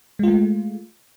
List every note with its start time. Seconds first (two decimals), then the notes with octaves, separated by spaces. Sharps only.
0.19 G#3
0.23 F4
0.27 A3